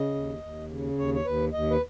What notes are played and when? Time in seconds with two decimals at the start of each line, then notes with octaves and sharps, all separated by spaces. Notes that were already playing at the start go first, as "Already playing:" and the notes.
Already playing: C#3 D#5
0.15 D#2
0.43 D#2
0.70 C#3
0.98 D#2 C#5
1.14 C#5
1.26 D#2 B4
1.53 D#2 D#5
1.71 B4